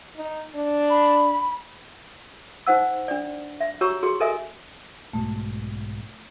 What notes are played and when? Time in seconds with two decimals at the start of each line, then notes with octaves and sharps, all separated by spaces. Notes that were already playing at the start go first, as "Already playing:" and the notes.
0.17 D#4
0.55 D4
0.90 B5
2.67 D#4 C5 F#5 E6
3.08 D4 D5
3.60 E5
3.81 F#4 G4 C#5 A#5 C#6 E6
4.02 F#4 G#4 C6
4.20 A4 A#4 D#5 E5 G#5
5.13 B1 G#2 B2 A3